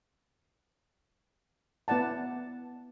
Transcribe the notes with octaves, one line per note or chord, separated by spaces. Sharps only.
B3 E4 D5 F#5 A5